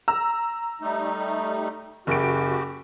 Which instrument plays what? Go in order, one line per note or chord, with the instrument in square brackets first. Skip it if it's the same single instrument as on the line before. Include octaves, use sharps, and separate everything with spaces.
[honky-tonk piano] A#5 E6
[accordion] G3 A3 D#4
[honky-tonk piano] F#1 D7 [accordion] F#4 G4